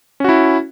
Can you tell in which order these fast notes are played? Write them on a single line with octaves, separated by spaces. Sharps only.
C#4 F#4 E4